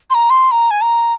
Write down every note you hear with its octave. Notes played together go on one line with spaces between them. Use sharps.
C6
A#5
C6
A#5
G#5
A#5